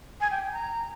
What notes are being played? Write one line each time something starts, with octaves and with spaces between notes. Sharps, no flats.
G#5
G5
G5
A#5